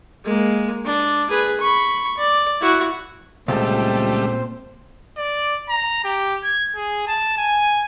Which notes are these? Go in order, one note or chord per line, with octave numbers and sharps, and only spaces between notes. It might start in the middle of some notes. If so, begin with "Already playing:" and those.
G#3 A#3
D4
G#4 B4
B5 C#6
D5
E4 F#4
C#2 A#2 G3 A3 C4 C5
D5
A#5
G4
G#6
G#4
A5
G#5